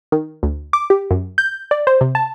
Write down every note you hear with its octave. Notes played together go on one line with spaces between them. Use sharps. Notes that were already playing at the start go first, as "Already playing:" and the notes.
D#3
D2
D6
G4
F#2
G6
D5
C5
C3
A5